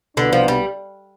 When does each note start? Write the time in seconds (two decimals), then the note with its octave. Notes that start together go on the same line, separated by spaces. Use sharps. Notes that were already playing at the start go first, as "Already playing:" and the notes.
0.17 C2 B2 D3 B3 D4
0.33 F3
0.48 G3